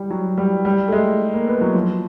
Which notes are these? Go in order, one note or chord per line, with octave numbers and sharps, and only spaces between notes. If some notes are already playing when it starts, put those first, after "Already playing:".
Already playing: G3
F#3
G3
G3
A3
G#3
A#3
B3
F#3
F3